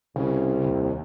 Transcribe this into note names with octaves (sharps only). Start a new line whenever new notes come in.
C2 C#3
D#2